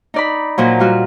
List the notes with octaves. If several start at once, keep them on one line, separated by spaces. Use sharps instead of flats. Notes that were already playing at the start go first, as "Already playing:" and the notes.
D#4 D5 B5
A#2 F3 F#3
G3 F4 F#4